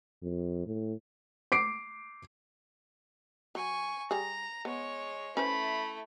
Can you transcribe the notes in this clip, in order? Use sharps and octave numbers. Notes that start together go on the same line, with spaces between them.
F2
A2
D6 C7 D7
F#3 G#5 C#6
G3 G#4 A#5
G#3 B3 C#5
A3 C#4 E4 B4 C5 B5